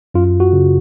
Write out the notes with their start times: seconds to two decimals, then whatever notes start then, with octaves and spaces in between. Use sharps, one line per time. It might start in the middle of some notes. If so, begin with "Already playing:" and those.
0.14 F#2 F4
0.40 F#4
0.53 C#3